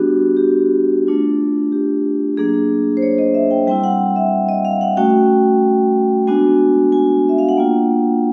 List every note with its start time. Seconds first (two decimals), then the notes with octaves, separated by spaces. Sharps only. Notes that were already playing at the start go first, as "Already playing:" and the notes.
Already playing: G3 B3 D4 F#4 G4
0.37 G4
0.43 F#4
1.07 A3 D4 F4
1.72 G4
2.37 F#3 A#3 D4 G#4
2.97 C5
3.02 C#5
3.18 D#5
3.34 E5
3.51 G5
3.67 G3 C4 E4 G5
3.84 F#5
4.16 E5
4.49 D#5
4.65 F5
4.81 F#5
4.97 A3 C#4 F#4 G5
6.27 G#3 B3 D4 F#4 G#5
6.92 G#5
7.29 E5
7.38 F5
7.49 F#5
7.57 A#3 D4 F4 G5